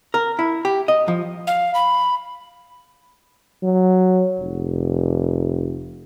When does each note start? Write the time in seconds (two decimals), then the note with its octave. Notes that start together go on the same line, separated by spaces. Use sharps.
0.14 A#4
0.39 E4
0.65 G4
0.88 D#5
1.08 F3
1.47 F5
1.75 B5
3.63 F#3
4.40 F1